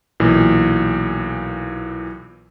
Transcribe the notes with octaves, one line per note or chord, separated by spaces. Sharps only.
B1 A#2 E3